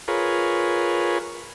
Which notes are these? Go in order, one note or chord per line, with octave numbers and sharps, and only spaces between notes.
F4 G#4 A#4 B4 C#5